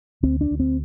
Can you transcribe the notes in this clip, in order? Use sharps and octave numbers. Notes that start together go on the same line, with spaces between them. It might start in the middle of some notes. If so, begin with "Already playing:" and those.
D2 C4
D4
D2
C4